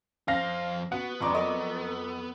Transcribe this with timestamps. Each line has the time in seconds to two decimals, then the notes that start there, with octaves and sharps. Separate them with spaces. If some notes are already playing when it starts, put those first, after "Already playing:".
0.28 F2 C5 F5 A#6
0.92 B3 F#4 F#5
1.21 F2 F3 G#3 D5 A#5 C#6 D6
1.35 F#3 A4 A#4 D#5